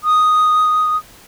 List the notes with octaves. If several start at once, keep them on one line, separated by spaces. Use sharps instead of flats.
D#6